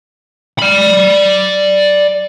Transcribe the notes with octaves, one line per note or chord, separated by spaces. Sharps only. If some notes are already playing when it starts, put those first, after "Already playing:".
D5 B5